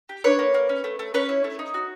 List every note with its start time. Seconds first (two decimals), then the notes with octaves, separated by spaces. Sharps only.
0.09 G4
0.24 D4 B4 C#5
0.39 A#3
0.54 A#3
0.69 C#4
0.84 A3
0.99 A3
1.14 C#4 B4 C#5
1.29 E4
1.44 A3
1.59 D#4
1.74 F#4